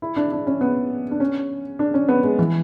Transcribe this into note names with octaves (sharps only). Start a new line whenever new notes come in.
E4
D4
D4
C#4
B3
D4
C#4
D4
C#4
B3
G#3
E3